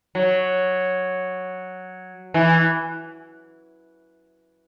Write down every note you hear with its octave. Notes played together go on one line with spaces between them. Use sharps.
F#3
E3